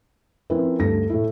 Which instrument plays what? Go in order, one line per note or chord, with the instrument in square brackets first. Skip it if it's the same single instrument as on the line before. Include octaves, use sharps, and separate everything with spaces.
[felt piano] F3 C4 C#4 E4 A#4 B4
D2 G2 A4 A#6
A2 A3 E4